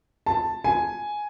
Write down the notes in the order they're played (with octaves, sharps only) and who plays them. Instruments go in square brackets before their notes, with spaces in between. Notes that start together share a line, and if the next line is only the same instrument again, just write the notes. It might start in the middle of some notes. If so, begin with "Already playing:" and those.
[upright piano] A5
G#5